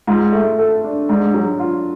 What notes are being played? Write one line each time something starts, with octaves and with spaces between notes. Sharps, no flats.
G#2 F4
A3
A4
D4
G#2 D4
F#3
F4